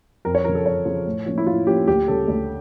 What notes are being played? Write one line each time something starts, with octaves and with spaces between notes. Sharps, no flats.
F2 A#4
C#5
C#3 F3 A#4
A4
F2 C#5
C#3 F3
A2
F3 A#3 C#4
E4
A2 F4
F3 A#3 C#4 G4
D2 G4
C#3 G3 C#4 A4
D2